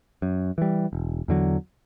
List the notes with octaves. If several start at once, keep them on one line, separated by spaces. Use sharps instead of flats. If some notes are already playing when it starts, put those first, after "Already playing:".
F#2
E3 G3
E1
E2 D3 F#3